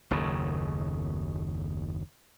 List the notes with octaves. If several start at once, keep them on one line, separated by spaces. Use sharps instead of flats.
F#1 D#2 A2 C#3